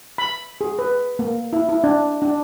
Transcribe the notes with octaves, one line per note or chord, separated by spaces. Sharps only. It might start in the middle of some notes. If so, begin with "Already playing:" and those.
B5
G#4
B4
A#3
E4
E4
D4
D4